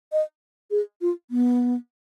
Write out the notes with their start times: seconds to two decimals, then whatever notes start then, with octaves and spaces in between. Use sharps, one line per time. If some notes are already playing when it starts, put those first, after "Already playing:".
0.12 D#5
0.71 G#4
1.01 F4
1.31 B3